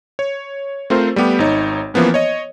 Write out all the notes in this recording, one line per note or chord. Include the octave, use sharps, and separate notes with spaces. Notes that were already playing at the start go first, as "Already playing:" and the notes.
C#5
A3 C4 F4 A#4 C5
G3 A3 B3 G4
G#1 D#4 C#5
E3 F3 A#3 B3 C#4
C#5 D#5